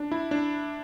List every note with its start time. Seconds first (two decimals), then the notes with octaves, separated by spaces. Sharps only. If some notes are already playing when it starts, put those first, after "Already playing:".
Already playing: D4
0.12 E4
0.31 D4